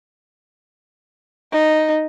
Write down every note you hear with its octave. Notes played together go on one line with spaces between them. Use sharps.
D#4